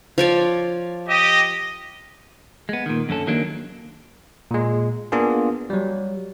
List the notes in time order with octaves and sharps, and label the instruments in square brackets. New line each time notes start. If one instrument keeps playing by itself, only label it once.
[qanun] F3 C#5 D5
[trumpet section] G4 D#5
[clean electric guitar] G#3 B3
A#2 D#3
F#2 D3 C#4 A4
D#3 F#3 G#3 A#3 D4
[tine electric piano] A#2 G#3
A#3 B3 D4 F4 G#4
F#3 G3